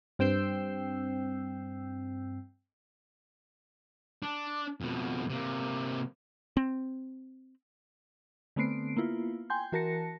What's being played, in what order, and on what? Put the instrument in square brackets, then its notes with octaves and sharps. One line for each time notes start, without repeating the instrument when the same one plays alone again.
[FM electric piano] G2 C4 G5 E6 G6 C7
[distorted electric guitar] D4
F2 B2
C3 A#3
[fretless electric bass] C4
[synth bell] D3 A3 B3 C4 C7 D7
A#3 B3 E4 F4
G5 G#5 C6 G6
E3 F#4 A#4 A5 A#6 C#7